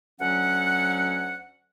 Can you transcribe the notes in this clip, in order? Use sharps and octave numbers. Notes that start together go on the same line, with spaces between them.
D2 F#3 C#4 F#5